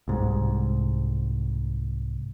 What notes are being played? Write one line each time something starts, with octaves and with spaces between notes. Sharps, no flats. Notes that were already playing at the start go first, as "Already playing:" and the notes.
C2 G#2